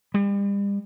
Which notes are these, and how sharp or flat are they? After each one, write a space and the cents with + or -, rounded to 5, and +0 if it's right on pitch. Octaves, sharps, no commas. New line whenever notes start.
G3 +40